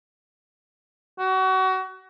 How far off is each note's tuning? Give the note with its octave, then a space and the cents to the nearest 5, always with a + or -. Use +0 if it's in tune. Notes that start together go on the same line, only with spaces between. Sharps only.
F#4 +30